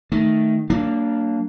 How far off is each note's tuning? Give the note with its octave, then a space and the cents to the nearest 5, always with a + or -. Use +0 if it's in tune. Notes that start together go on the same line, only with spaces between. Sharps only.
D#3 +0 A3 +0
F#3 +40 A#3 -15 D4 +0